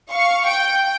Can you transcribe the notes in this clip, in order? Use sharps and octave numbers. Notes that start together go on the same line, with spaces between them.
F5 C#6
G5